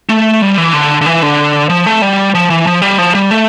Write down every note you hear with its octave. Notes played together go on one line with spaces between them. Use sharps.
A3
G3
E3
D3
D3
E3
D3
F3
A3
G3
F3
E3
F3
G3
F3
G3
A3